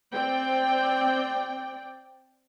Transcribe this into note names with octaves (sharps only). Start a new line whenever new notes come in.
C4 D5 G5